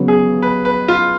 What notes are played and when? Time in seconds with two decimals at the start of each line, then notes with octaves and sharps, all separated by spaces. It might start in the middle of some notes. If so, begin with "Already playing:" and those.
Already playing: C#3 F#3 B3
0.08 G#4
0.42 B4
0.65 B4
0.88 F4